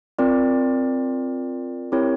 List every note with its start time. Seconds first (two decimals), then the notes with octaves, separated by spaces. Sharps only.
0.18 C4 F4 A#4 D5
1.92 C4 E4 G4 A#4 C#5